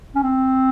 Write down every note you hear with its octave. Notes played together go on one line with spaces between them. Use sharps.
C#4
C4